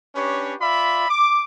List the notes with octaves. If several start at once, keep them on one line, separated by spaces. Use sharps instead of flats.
C#4 D4 G4 B4 C#5
F4 D5 E5 B5
D6